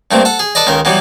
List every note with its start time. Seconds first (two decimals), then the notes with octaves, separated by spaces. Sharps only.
0.11 G2 A3 A#3 C4
0.25 A4 F#5
0.39 G#4
0.55 A4 B4 D5 D#5
0.67 C#2 D#3 A#4
0.85 B2 E3 F#3 G3 B3